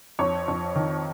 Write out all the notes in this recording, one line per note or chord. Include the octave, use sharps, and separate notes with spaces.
F2 C#5
F2
D#3